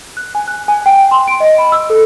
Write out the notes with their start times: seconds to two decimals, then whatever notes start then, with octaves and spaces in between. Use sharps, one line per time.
0.17 F#6
0.35 G#5
0.48 F#6
0.68 G#5
0.86 G5
1.11 C6
1.28 D7
1.40 D#5
1.58 B5
1.72 E6
1.90 A4